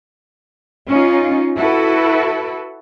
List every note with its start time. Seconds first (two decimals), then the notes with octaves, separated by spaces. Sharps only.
0.88 C#4 D#4 F4
1.57 E4 F#4 A4 B4